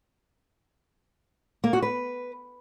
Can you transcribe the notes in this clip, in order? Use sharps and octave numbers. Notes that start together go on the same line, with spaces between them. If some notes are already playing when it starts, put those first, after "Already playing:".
A#3
F#4
B4